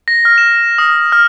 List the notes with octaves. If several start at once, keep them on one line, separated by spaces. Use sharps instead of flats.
A#6
F6
E7
D#6
F6